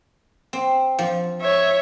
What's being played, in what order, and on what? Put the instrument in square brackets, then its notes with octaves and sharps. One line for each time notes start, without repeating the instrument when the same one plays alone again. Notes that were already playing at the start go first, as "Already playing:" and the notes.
[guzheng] C4
F3
[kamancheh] C#5 E5